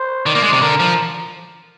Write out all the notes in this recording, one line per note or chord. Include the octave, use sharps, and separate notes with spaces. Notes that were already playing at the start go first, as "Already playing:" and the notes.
Already playing: C5
D#3 D5
A#3
G#3
C3
D3 A#4
F3